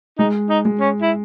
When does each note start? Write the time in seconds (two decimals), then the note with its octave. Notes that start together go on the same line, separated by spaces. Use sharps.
0.19 G#3 D#4
0.50 D#4
0.65 G#3
0.80 C#4
1.02 E4